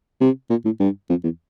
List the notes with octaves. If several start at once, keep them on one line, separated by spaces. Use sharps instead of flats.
C3
A#2
A2
G2
F2
E2